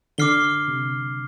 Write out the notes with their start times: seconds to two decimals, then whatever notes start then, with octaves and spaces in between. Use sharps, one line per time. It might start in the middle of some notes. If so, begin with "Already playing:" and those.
0.18 D3 D6 F6 C7 G7
0.68 C3